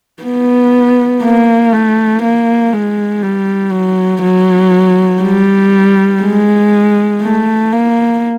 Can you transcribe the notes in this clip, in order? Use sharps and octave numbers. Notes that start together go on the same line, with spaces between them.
B3
A#3
A3
A#3
G#3
G3
F#3
F#3
G3
G#3
A3
A#3